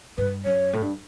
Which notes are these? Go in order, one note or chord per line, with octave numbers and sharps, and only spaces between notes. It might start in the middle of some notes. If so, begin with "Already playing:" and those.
G2 B4
F#2 C#5
A2
G2